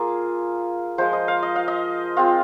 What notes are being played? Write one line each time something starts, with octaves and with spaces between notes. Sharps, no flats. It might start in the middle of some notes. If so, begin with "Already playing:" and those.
Already playing: A#3 F4 G#4
F3 G#3 F4 C5
D#5
F5
D#5
F5
D#5
G#3 C4 F4